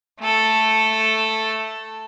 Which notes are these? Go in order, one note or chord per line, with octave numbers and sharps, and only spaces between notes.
A3 A4